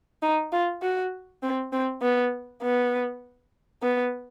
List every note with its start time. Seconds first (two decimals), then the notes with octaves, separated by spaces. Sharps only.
0.22 D#4
0.52 F4
0.82 F#4
1.43 C4
1.73 C4
2.02 B3
2.62 B3
3.82 B3